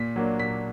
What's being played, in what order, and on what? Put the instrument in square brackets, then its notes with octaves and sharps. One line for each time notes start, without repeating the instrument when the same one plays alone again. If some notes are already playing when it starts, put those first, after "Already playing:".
Already playing: [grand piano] A#2 B6
F#3 A#3 D4
A#2 B6